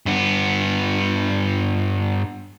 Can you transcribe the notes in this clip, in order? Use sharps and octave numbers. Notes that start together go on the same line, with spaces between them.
G2 B3